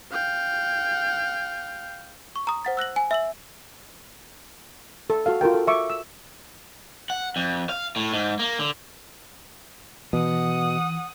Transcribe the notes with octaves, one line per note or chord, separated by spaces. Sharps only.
F5 G5
C#6
A#5 D#6
C5 F#5 A6
E6 F#6 A#6 F#7
G#5
E5 E6 F#7
A4
F#4 A4 F5
F4 F#4 A#4 G5
A4
E5 C#6 D6
E6
F#5
F2
F5
A2
G#2
A#3
D3
B2 E3 F#5 D#6